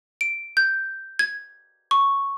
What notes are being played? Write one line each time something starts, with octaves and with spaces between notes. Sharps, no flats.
D7
G6
G#6
C#6